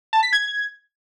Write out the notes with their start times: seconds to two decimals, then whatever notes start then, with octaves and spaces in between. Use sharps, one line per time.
0.13 A5
0.23 B6
0.33 G#6